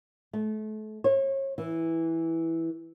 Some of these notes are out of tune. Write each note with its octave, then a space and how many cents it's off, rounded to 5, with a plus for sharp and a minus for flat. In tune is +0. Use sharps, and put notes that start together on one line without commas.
A3 -35
C#5 -35
E3 -5